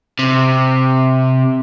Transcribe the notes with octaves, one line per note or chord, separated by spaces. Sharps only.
C3